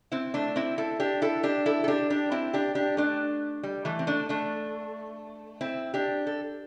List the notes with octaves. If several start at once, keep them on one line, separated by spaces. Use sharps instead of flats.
C4 E4
A3 D4
C4 E4
E4 A4
D4 G4
E4 A4
D4 G4
E4 A4
A4
D4 G4
D4 G4
C4 E4
D4 G4
D4 G4
A3 D4
G3
E3 A3
C4
A3 D4
A3 D4
C4 E4
D4 G4
A4